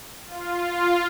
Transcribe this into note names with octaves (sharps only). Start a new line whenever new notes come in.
F4